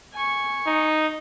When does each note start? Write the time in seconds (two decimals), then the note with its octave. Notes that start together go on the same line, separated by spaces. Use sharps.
0.13 G#5 C#6
0.66 D#4